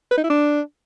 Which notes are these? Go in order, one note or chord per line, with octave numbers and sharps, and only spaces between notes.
B4
D#4
E4
D4